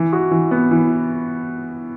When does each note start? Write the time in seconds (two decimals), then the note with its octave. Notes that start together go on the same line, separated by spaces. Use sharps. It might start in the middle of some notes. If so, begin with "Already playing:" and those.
Already playing: E3
0.13 F#4
0.31 E3
0.51 B3
0.71 E3